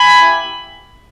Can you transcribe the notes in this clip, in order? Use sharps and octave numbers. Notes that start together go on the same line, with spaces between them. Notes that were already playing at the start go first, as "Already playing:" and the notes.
Already playing: G#5 B5
A#3 E4 G4